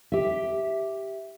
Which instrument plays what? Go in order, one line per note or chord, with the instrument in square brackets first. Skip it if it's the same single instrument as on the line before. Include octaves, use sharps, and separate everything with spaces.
[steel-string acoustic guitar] G4 E5